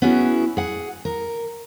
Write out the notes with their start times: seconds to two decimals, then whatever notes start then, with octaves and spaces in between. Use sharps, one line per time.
0.02 B3 C#4 E4 F#4 G#4
0.57 G#4 F#5
1.05 A#4